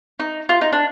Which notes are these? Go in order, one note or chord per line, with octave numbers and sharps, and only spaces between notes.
D#4
F4
D#4
D4